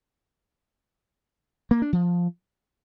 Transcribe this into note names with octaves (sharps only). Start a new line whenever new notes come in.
A#3
D4
F3